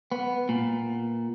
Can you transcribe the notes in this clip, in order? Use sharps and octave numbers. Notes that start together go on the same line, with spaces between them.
B3
A#2